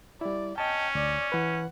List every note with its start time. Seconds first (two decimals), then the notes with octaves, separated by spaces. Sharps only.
0.21 G3 E4 D5
0.58 C#4 D#5 G5 A5
0.95 D2 D5
1.32 E3 B4 F#5